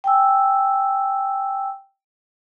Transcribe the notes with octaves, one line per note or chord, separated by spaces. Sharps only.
G5 G#5 E6